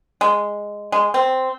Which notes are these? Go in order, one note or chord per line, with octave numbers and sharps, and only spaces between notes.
G#3
G#3
C4